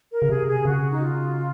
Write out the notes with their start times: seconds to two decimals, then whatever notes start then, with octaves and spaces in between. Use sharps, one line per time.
0.11 A#4
0.22 C#3
0.29 C3 G#4
0.47 G#4
0.65 C#3 F#4
0.90 D#4
1.01 F4